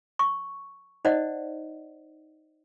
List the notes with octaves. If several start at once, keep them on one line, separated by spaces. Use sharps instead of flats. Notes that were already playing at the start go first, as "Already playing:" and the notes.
C#6
D#4 C5 D5 D#5 F#5